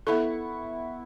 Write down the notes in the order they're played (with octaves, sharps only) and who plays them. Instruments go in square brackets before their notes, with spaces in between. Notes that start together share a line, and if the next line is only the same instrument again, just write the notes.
[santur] B3 E4 C#6 [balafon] A4